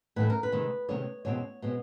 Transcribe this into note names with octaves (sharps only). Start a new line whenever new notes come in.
A2 E3 A3 B4
A#4
B4
C3 D#3 G#3 C4
C3 D#3 G#3 C4 C#5
E2 B2 G#3 C4 C#5
B2 G#3 C4